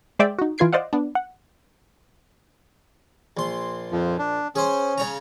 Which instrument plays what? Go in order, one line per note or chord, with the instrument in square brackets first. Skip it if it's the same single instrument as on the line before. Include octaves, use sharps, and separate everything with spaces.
[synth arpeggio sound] G#3 C5 D5 E5 G5
D#4 F#4
E3 F4 B4 G#6 C7 D7
C5 D5 D#5 F5 F#5
B3 D4
F#5
[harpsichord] A#1 C6
[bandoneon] F2 F3
D4
[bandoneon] C#4 [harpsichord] G#4 C5
[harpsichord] C#3 C#5 A#5